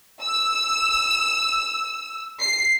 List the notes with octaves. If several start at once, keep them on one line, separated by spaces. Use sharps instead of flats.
E6
C7